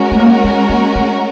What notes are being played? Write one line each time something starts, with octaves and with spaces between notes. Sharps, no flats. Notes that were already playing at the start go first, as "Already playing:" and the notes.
Already playing: G#3 C#4 F#4 A#4
A3
A#3
B3
A#3
A3